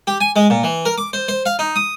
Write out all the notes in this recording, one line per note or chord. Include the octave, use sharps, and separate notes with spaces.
G4
G#5
G#3
A#2
E3
A#4
D6
C5
C5
F5
D#4
D#6